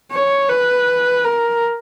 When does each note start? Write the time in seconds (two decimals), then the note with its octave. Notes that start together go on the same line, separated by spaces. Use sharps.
0.12 C#5
0.49 B4
1.24 A#4